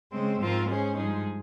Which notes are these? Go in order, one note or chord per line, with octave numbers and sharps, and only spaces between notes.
C#3 G#3 C4
G#2 F3 C4 F4 A#4
G#3 C#4 G#4 C5
G2 F3 G#3 D#4 G#4